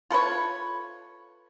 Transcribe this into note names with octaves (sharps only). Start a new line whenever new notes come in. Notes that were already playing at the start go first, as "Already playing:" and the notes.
F4 A4 B4 C#5